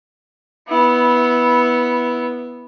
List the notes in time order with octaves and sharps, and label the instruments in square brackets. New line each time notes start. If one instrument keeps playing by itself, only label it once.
[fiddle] B3 E4